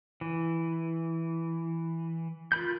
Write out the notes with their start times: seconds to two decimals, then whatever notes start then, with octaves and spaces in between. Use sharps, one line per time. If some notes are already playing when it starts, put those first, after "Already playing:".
0.21 E3
2.52 F4 A#4 B5 G6